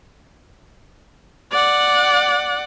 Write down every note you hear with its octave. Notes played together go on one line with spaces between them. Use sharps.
D5 F#5